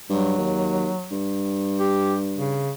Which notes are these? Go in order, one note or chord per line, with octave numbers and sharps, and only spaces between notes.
G2 F#3
D#2
G2
G4
C#3